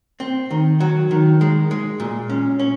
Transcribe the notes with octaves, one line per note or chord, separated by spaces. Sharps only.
C4
D#3
F#3
D#3
G#3
G#3
A#2
C#4
C#4